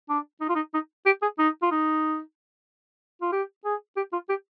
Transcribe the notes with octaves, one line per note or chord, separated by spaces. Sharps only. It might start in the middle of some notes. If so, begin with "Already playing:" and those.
D4
D#4
F4
D#4
D#4
G4
G#4
D#4
F4
D#4
F4
G4
G#4
G4
F4
G4